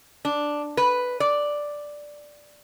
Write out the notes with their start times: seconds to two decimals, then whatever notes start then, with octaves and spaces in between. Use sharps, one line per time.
0.25 D4
0.77 B4
1.20 D5